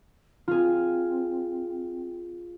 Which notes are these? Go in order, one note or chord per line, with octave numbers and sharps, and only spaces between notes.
C4 F4 G#4